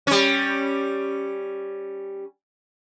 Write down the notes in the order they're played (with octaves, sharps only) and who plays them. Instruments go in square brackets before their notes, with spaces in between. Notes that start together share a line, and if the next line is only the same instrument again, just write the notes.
[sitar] G3 C#4